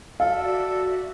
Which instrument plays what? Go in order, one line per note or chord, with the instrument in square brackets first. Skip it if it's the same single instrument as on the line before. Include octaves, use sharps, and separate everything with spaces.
[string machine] F#4 D5 E5 [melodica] A4 [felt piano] F5